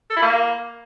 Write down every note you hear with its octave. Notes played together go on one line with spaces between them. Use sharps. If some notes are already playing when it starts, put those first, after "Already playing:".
A4
E4
A#3